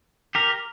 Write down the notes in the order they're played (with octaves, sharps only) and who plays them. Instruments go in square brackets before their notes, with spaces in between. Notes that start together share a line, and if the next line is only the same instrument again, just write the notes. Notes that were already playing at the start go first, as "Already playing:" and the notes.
[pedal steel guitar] G4 A#4